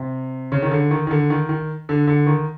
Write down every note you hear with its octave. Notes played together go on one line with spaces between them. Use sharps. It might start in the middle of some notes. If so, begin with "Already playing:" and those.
Already playing: C3
C#3
D#3
D3
D#3
D#3
D3
D#3
D#3
D3
D3
D#3